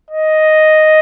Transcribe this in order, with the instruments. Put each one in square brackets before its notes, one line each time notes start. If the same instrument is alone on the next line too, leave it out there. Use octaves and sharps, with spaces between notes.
[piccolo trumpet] D#5